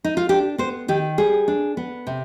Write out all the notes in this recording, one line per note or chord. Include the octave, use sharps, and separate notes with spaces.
D#4
F4
D4 G4
B3 C5
D#3 G4
G3 G#4
D4
B3
C3